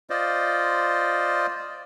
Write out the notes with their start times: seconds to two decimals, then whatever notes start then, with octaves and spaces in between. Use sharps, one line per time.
0.10 F4 C5 D5 D#5